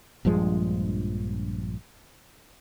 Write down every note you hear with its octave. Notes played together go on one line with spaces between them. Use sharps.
A#1 G2 F3 G#3